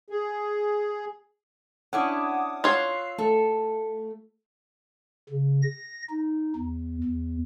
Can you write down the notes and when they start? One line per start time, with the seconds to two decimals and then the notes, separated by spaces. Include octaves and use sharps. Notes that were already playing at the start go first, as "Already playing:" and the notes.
0.10 G#4
1.93 C#4 D4 E4 F#5 D6 D#6
2.64 F4 C#5 E6 F#6 C7
3.18 A3 A4
5.30 C#3
5.62 A#6
6.10 D#4
6.56 E2
7.04 E2